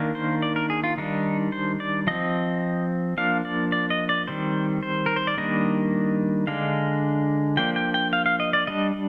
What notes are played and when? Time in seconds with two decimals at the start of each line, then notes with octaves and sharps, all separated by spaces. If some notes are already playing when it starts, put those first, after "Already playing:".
Already playing: D#3 A#3 D4
0.15 C5
0.42 D5
0.56 A#4
0.70 G#4
0.84 F4
0.98 D#3 G3 D4 D#4
1.52 C5
1.80 D5
2.07 F3 C4 D#5
3.17 F3 A#3 D4 F5
3.45 D5
3.72 D5
3.90 D#5
4.09 D5
4.28 D#3 G3 C4 C5
4.83 C5
5.06 A#4
5.16 C5
5.27 D5
5.37 D#3 G3 A#3 D4 D#5
6.47 D3 G#3 D4 F5
7.57 F3 A#3 D4 G5
7.76 G5
7.94 G5
8.13 F5
8.26 F5
8.40 D#5
8.53 D5
8.67 G3 D4 D#5